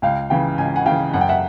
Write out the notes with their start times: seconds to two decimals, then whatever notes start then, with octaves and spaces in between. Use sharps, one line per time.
0.02 C#2 F5 G5
0.30 C#3 E3 F5 G5
0.58 C#2 G#5
0.76 F#5 G#5
0.86 C#3 F5 G5
0.89 E3
1.13 F#2 F#5
1.21 G5
1.29 E5 F#5